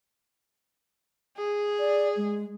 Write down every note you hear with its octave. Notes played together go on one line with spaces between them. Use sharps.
G#4
D5
G#3